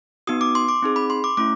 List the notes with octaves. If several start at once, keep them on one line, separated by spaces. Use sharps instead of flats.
B3 D#4 F#4 D#6
D6
C6
D6
C4 D#4 G#4
B5
C6
D6
A3 C#4 E4 D6